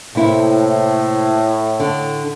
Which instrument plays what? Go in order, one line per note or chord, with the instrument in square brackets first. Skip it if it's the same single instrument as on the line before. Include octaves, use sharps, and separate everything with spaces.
[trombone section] A2 [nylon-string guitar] C3 A#3 E4
[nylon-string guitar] D3